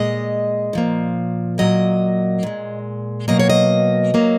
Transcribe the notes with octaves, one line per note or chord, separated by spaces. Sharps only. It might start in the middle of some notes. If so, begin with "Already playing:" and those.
Already playing: A#2 G#3 D#5
A#2 F3 A#3
A#2 F#3 A#3 D#5
A#2 G#3
B2 F#3 A#3 D#5
C#5
D#5
F#3 A#3